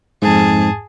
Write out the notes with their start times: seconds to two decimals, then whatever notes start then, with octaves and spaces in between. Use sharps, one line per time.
0.22 F2 G#2 G#4 A5